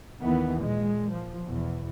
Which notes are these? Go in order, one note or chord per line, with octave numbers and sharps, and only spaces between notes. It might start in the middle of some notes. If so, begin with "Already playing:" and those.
D#2 D#3 E3 B3
A#2 G#3
F3
E2 B2